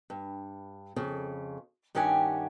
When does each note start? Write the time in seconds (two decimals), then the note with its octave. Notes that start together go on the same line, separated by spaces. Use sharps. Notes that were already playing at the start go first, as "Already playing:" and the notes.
0.10 G2
0.96 F2 C#3
1.95 G2 D#3 C#4 G4 F#5 G#5